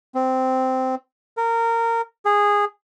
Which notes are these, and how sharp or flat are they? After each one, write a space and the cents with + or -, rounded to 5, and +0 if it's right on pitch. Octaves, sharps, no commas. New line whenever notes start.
C4 -10
A#4 -20
G#4 -15